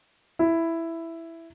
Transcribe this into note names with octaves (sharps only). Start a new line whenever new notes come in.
E4